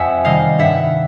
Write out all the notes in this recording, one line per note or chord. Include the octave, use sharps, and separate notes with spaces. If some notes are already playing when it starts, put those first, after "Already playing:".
Already playing: F2 E5 F#5 G#5
C3 D#3 G3 D#5 F5
G2 E5 F#5